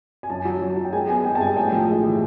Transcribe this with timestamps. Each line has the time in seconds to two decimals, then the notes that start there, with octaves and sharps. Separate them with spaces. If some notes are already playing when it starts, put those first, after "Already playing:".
0.23 G#5
0.30 F#2 A5
0.45 F#3
0.62 F#3
0.77 F#3
0.84 G5
0.93 G#3 G#5
1.09 B3 G#5
1.24 G#3 G5
1.35 A5
1.40 G2 G#5
1.57 A2 G5
1.72 A#1
1.89 G#3
2.04 E3